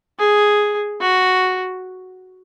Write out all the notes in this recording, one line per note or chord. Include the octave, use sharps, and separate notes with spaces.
G#4
F#4